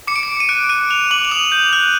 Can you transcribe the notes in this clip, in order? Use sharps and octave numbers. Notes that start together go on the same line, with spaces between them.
D6 C#7
D7
C#7
D6
D#7
F#6 D7
F#6 D#7
F#6 F7
D6 F#7
F#7
D#6 F7
G6
F#6